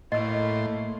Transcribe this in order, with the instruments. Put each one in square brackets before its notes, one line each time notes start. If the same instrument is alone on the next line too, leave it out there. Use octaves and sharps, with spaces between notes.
[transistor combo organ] A2 C6 [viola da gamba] A3 A#3 E4 [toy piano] D#5 E6